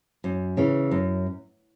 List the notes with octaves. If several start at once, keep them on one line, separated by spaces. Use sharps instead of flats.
F#2
C#3 E3
F#2